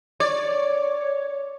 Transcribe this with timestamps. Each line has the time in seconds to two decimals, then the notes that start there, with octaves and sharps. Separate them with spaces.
0.20 C#5 D5